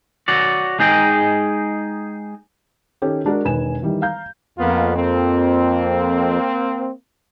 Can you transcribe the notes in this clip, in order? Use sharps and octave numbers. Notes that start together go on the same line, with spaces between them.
F#4 C#5 D5
G#3 D#4 G#4 D#5 G5
D#3 C#4 G4 A4
G#3 D4 F#4 A#4
E1 D#3 B4 G#5 E7
D#3 E3 G3
F5 A#5 G6
F2 A#3 B3 F4
A#3 C4